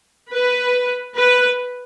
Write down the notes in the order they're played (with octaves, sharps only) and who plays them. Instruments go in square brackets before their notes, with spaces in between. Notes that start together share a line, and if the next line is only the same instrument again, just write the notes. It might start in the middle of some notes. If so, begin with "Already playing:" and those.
[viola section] B4
B4